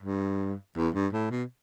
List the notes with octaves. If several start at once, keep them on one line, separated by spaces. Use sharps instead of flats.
G2
E2
G2
A2
B2